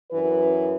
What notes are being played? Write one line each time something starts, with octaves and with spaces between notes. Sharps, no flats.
F#2 E3 B4